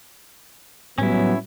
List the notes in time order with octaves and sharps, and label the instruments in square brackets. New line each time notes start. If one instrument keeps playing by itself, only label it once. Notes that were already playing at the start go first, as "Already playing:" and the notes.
[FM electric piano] A2 G3 [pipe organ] F#3 B3 [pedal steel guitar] C#4 E4